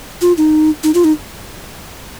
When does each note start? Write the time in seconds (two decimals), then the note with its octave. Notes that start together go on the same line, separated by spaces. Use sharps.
0.22 F4
0.38 D#4
0.84 D#4
0.94 F4
1.04 D#4